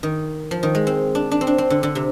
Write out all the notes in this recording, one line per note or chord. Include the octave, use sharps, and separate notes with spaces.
D#3
F3
D#3
G#3
C4
D4
D4
C4
D4
C4
D3
D3
C3